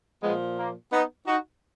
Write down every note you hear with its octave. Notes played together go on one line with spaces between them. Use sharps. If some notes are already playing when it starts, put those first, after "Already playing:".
A#2 F3 G#3 B3
A#3
B3 D#4
D#4 F#4